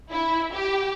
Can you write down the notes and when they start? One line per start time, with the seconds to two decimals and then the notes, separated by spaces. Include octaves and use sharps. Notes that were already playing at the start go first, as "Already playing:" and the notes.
0.11 E4
0.53 G4